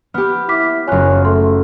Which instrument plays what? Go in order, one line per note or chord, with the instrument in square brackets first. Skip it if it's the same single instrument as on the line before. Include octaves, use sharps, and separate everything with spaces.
[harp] B3 G4 [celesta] F6
[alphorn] E4 [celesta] D6 F6 B6
[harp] F#1 F4 [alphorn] C#5 [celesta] G#5 F#6
[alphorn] A3 [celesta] A4 C6